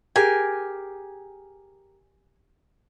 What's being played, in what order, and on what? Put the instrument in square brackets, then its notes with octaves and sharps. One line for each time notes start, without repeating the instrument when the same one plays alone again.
[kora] G4 G#4 A#4 [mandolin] G#5